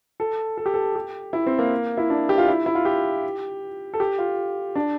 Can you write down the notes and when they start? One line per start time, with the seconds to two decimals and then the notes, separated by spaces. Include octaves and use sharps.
0.20 A4
0.57 A4
0.66 G4
0.74 A4
0.96 G4
1.33 E4
1.46 C4
1.59 A#3
1.97 E4
2.10 D4
2.29 G4
2.38 F4
2.48 E4
2.66 E4
2.75 F4
2.85 G4
3.94 A4
4.00 G4
4.19 F4
4.75 D4